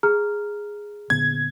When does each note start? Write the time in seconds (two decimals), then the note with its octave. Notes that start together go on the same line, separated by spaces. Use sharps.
0.03 G#4 A#5 F6
1.10 A#2 D3 B3 G#6